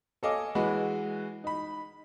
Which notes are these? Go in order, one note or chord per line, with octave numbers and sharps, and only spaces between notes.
A4 C#5 D#5 F5 G#5 D6
E3 G#3 E4 F#4 B4
D#4 B5